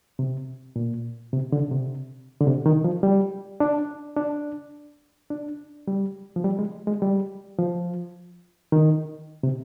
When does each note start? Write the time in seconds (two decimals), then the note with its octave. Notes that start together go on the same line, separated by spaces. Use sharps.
0.19 C3
0.76 A#2
1.33 C3
1.52 D3
1.71 C3
2.41 D3
2.47 C3
2.66 D#3
2.84 F3
3.03 G3
3.60 D4
4.17 D4
5.30 D4
5.88 G3
6.36 F3
6.44 G3
6.59 G#3
6.87 G#3
7.02 G3
7.58 F3
8.72 D#3
9.43 C3